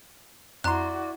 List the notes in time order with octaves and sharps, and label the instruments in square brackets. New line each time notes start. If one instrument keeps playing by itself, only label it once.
[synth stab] F2 C6 [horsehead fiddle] E4 F#4 [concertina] D5 [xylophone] A#5 F#6